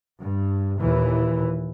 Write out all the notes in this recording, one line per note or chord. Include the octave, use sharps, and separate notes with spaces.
G2
D#2 A#2 E3